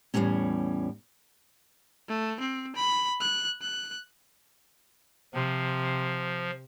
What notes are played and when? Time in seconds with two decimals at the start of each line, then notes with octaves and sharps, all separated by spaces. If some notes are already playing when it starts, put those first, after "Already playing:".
0.14 E2 A2 F3 G3 A3 C#4
2.08 A3
2.40 C4
2.76 B5
3.20 F#6
3.62 F#6
5.34 C3 F3